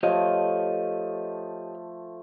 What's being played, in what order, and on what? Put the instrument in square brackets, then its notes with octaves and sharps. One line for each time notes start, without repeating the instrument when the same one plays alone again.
[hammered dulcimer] F3 A3 [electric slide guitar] G4 C#5 D#5